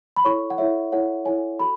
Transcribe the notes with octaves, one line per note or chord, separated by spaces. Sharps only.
B5
E4 A4 C#5 C#6
F#5
E4 A4 C#5 E5
E4 A4 C#5 F#5
E4 A4 C#5 G#5
F#4 A4 B5